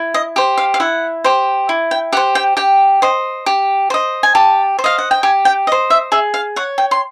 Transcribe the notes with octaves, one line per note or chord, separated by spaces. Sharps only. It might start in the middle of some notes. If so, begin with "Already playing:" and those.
Already playing: E4
D#5
G4 C5
F5
F5
E4 F#5
G4 C5
E4
G5
G4 C5 F#5
G5
G4 G5
C5 D#5
G4
C5 D#5
G#5
G4 A5
C5
D#5 F5
F#5
G5
G4 G#5
G5
C5 D#5
E5
G#4 E5
F5
C#5 F#5
G5
C6